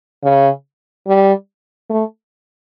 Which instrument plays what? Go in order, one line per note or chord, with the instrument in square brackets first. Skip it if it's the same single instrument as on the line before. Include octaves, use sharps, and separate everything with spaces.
[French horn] C#3
G3
A3